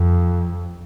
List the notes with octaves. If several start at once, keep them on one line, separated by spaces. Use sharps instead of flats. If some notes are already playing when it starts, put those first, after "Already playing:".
Already playing: F2